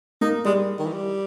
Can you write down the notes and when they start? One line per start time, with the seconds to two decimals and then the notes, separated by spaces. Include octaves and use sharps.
0.21 A#3 D#4
0.45 G3 G#3
0.79 D#3
0.86 E3
0.93 G3